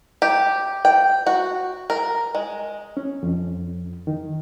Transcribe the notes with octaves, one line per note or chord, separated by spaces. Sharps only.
G4
G5
F#4
A#4
G#3
C#4
F2
D#3